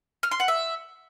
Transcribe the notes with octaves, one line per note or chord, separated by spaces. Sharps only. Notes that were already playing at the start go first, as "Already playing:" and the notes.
F6
C6
F#5
E5